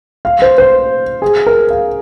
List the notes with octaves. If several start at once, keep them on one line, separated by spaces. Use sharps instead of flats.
F5
C5
C5
G#4
A#4
F5